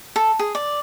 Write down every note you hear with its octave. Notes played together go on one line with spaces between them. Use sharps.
A4
G#4
D5